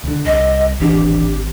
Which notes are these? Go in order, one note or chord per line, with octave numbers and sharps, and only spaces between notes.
C#2 D3
C2 D#5
D1 G#1 E3 D4 G4